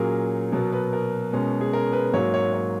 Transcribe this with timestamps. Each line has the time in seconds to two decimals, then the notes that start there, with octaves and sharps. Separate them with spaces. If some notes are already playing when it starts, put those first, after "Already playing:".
Already playing: A#2 F#3 C#4 G#4 A#4
0.52 B2 F#3 B3 A#4
0.73 B4
0.93 A#4
1.33 B2 G#3 C#4
1.61 G#4
1.73 A#4
1.92 B4
2.13 G#2 F#3 A#3 C#5
2.34 C#5
2.53 C#5